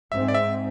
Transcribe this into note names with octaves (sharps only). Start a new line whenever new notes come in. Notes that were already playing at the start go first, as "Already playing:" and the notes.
G#2 G#3 C4 E5
D5
E5